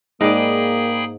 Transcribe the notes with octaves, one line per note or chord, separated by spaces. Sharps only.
G#2 A#3 D#4 G#4 D5 G5 B5